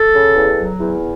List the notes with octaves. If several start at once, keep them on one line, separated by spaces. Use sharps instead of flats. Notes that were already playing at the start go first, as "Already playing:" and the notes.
Already playing: A4
C#3
E2
F#3
E2